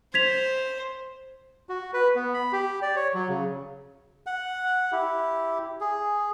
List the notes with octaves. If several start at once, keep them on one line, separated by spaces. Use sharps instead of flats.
C5 G#6 B6 F7
F#4
B4
B3
B5
G4
D5
C#5
F#3
C#3
F#5
E4 G4
G#4